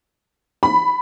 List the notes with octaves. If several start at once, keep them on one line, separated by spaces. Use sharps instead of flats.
B5